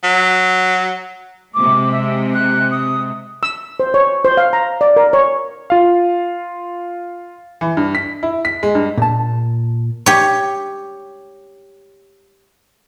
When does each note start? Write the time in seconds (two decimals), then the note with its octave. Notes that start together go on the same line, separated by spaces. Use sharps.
0.03 F#3
1.54 C3 G#3 D6
1.91 E5
2.33 F#6
2.71 D#6
3.43 E6
3.80 C5
3.94 C#5
4.25 C5
4.37 F5
4.53 A#5
4.81 D5
4.96 A#4
5.13 C#5
5.70 F4 F5
7.61 E3
7.77 G2
7.95 B6
8.23 E4
8.45 B6
8.63 G#3
8.75 G2
8.97 A#2 A5
10.06 G4 C#5